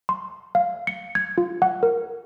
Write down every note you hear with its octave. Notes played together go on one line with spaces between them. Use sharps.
C6
F5
C#7
G#6
F4
F#5
A#4